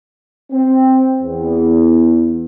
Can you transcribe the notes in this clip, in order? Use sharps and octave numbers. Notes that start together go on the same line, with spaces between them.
C4
E2